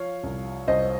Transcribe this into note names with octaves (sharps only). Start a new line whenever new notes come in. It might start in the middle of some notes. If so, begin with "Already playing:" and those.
Already playing: F3 C#5 F5
C2
C2 C5 D#5